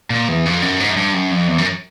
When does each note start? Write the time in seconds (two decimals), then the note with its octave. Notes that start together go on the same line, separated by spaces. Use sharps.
0.10 A#2
0.29 E2
0.45 F2
0.62 F#2
0.80 G#2
0.90 F#2
0.96 G2
1.14 F#2
1.31 F2
1.47 E2
1.58 F#2